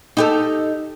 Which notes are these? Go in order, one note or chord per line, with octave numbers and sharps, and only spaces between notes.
D#4 G4 A4